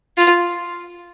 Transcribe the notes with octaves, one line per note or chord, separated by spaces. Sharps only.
F4